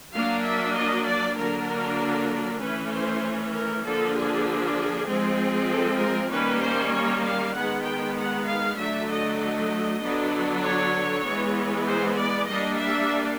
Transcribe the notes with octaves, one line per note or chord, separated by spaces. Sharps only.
F#3 A#3 D4 F5
E5
D#5
D5
D3 F#3 A#3 D4 A#4
E3 A3 C#4 B4
C5
A#4
D3 F3 A#3 D4 A4
G#4
F3 G#3 C4
A4
A#4
D#3 G3 A#3 C#4 B4
C5
C#5
F5
D#3 G#3 B3 F#5
G5
F#5
F5
D3 F#3 A3 D4 E5
D#5
D#5
D3 F#3 B3 D4
C#5
E3 G#3 B3
C5
D5
G3 A#3 D4 D#5
E5